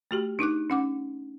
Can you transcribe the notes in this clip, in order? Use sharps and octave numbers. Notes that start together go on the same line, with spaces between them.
A3 F#4 G4
D4 D#4 D6 F#6
C#4 F#5 D6